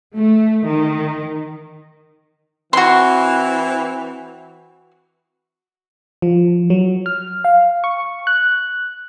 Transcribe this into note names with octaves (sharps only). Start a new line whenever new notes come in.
A3
D#3
E3 C4 F#4 C6
F3
F#3
F6
F5
C#6
F#6